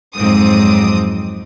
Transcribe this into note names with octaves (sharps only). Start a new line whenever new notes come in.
F2 G#2 F#3 C4 D6 D#6